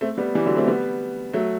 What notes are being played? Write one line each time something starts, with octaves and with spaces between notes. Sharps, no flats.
A3 C4
G3 B3
E3 G3
D3 F#3
A3 C4
G3 B3
F#3 A3